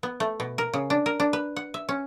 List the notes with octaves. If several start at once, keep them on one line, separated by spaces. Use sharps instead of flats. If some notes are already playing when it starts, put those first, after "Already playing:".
B3
A3
B2
A#4
C#3
D4
A#4
D4
B4
F#5
E5
C#4